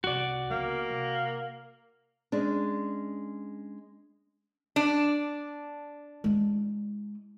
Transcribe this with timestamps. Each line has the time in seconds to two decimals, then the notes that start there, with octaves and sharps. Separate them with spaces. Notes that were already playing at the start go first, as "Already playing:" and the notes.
0.04 C2 F#4 D5
0.51 C#2 A#3 B3
0.90 C3
2.32 G#3 C#4 D4
4.76 D4
6.24 G#3 E4